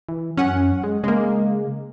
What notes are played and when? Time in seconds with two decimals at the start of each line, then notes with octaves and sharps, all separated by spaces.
0.09 E3
0.37 F#2 C#4 F#5
0.84 G#3
1.04 C#3 G#3 A#3